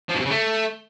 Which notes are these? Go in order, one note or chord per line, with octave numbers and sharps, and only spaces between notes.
F3
B2
C3
C#3
A3